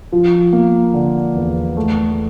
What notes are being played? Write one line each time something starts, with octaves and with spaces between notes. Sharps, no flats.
F3
A#3
D3
E2
A3